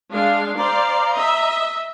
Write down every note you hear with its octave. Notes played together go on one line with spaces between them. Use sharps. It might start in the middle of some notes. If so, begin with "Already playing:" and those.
G#3 D4 F5
C5 D5 F5 A#5
D#5 E5